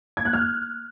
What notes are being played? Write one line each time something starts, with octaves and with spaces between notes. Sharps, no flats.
G#6
F#6
F6